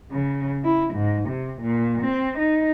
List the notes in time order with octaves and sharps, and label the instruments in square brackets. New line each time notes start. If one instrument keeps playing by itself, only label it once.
[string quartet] C#3
E4
G#2
C3
A#2
C4
D#4